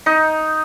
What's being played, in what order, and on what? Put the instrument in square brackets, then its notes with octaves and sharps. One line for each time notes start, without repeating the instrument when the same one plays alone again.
[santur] D#4